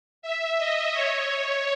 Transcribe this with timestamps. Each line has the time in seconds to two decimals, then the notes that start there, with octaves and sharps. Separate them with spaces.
0.22 E5
0.58 D#5
0.94 C#5